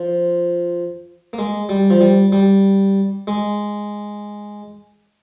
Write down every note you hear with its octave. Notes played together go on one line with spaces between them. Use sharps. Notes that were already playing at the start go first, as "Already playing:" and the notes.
Already playing: F3
A#3
G#3
G3
F3
G3
G3
G#3